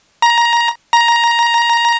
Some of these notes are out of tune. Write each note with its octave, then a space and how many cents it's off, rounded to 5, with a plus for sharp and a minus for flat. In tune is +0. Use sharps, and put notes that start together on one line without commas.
A#5 +15
A#5 +10